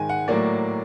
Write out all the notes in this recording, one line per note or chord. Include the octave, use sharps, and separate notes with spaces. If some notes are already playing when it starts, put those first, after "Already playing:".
Already playing: G#2 D#3 G#3 G#5
F#5
A2 F#3 A#3 D5